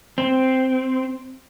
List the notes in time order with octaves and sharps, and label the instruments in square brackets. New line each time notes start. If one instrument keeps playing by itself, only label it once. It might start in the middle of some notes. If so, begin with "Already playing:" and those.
[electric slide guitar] C4